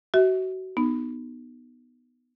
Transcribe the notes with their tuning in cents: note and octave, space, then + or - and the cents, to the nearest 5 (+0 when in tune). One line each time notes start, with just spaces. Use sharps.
F#4 +25 E5 -30
B3 +0 D#4 -20